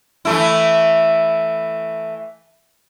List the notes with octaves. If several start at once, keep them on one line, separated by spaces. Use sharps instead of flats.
E3 A3 E4